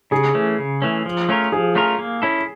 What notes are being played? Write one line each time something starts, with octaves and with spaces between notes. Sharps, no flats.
C#3 G#4
E3 A3 C#4
C#3
E3 A3 C#4
F3
A3 C#4 F4 A#4
F3 G#4
A3 C#4 F4 A#4
A#3
C#4 E4 A4